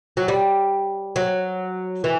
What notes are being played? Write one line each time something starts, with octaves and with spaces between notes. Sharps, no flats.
F#3
G3
F#3
E3